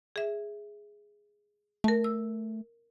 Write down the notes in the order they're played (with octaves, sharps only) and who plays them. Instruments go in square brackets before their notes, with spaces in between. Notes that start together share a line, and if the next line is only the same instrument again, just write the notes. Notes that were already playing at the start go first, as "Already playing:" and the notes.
[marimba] G#4 E5
[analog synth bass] A3 [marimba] A#4 A5
[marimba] E6